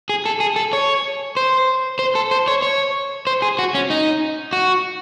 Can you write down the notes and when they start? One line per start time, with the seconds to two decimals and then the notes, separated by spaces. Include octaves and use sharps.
0.09 G#4
0.26 A4
0.40 G#4
0.56 A4
0.73 C#5
1.37 C5
1.99 C5
2.15 A4
2.31 C5
2.48 C#5
2.62 C#5
3.27 C5
3.42 G#4
3.59 F#4
3.74 C#4
3.90 D#4
4.53 F#4